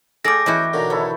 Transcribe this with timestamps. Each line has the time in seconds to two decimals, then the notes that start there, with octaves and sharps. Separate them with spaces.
0.25 A3 G#4 A4 D5 F5 G5 D6 A#6
0.46 E2 C#4 E4 F#4 D#5 G5 C#6
0.74 B2 D3 D#3 C#5 A#5
0.90 B3 E4 A4 C#5